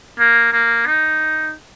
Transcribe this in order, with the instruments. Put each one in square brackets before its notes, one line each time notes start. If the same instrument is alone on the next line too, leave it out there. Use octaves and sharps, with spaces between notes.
[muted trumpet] A#3
A#3
D#4